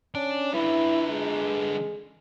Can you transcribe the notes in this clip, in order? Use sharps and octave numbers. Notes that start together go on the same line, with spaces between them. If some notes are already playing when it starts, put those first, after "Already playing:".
C#4 D4 D5
D3 E4 B4
G#3